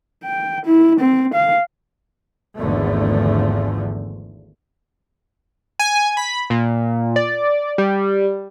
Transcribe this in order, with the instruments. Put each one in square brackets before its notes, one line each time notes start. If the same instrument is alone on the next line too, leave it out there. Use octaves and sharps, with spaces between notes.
[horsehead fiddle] G5
E4
C4
F5
[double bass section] G#1 E2 G#2 D3 F3 A3
[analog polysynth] G#5
B5
A#2
D5
G3